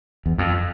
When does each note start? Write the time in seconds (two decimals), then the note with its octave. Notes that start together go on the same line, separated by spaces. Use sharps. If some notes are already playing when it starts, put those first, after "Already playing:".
0.26 E2
0.38 F2